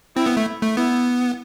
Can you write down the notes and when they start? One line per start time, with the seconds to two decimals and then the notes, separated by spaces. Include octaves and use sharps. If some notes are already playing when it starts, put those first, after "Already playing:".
0.16 C4 E4
0.26 B3
0.37 A3
0.62 A3
0.77 B3 E4